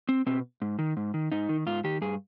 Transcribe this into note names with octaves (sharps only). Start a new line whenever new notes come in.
C4
B2 C4
G#2
D#3
G#2
D#3
G#2 D#4
D#3
G#2 F4
D#3 G4
G2 G#4